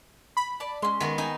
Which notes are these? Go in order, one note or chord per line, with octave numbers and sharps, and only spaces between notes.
B5
D5 A5
G#3 C#4 C6
D#3 B3
D#4 G#5